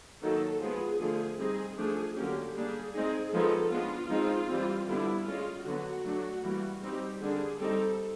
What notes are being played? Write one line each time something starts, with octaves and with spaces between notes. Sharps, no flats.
D#3 F#3 A#3 A4
F3 G#3 B3 G#4
D3 F3 A3
G3 C4 D#4 G#4
F3 A3 D4 G#4
D3 F#3 A#3 C#4 G4
G3 A#3 D4 G#4
G#3 C4 D#4 G#4
F3 G#3 B3 D#4 A4
G#3 B3 D4 F4
F3 G#3 C4 D#4
E3 G3 C4
D3 G3 B3 D4 E4
G#3 C#4 F4
D3 F#3 B3 F#4
F#3 A3 D4
E3 G3 A#3
G3 C4 D#4 G4
D3 G3 A#3 D4 G#4
G3 C4 D#4 A4